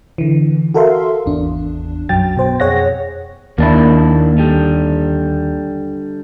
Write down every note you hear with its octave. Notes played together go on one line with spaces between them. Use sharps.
D3 E3
F#4 A4 A#4 E5 F5 C6
G#1 E2 D4
B1 F#2 F#3 G5 A6
B2 C5 G5
F2 G#4 C#5 F#5 A#6
D#2 A#3 D4 E4
D3 G3